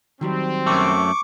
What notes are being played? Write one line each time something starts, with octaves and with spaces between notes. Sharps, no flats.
D#3 F#3 G3 C4
F#2 A3 C#6 D6